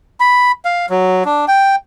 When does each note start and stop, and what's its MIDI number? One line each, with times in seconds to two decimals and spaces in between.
0.20 0.52 83
0.65 0.86 77
0.90 1.24 54
1.25 1.45 62
1.48 1.76 79